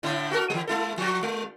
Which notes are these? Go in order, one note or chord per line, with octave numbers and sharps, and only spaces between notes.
A2 D3 E4
F#4 A4 A#4
E3 G3
G#3 E4 A4
F3 F#4
G#3